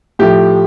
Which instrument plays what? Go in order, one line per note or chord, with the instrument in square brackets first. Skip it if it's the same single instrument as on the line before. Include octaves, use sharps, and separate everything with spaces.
[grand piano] A2 F3 A3 G4